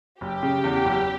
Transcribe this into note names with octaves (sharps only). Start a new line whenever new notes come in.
F#1 G4
C#3
E2
F#1